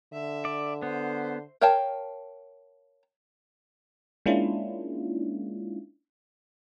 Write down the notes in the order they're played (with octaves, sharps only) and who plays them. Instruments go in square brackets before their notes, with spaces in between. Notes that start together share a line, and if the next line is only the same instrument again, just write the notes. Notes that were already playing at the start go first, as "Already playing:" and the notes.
[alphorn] D3 [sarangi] E5
[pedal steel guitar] D5
[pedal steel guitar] B3 [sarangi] C5
[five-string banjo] A#4 C#5 F5 G5 A5
[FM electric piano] G#3 A#3 C#4 D4 E4 F4